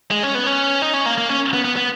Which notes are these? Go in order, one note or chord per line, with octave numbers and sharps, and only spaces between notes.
G#3
C#4
B3
C#4
D#4
C#4
A#3
A#3
C#4
B3
B3
B3